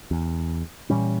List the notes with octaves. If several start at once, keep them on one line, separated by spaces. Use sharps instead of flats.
E2
A#2 E3 G3 C#4